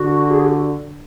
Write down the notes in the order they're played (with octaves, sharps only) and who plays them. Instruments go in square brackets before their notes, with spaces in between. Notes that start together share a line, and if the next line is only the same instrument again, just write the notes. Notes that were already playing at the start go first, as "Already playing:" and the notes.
Already playing: [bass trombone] D3 [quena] F#4
[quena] G#4
G4
F#4